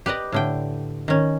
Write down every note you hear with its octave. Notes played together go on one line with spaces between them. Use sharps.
G4 B4 D5 D#5
A2 D3 G5
D#3 C#4